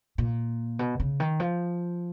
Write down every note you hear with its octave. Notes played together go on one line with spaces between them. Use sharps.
A#2
B2
C#3
D#3
F3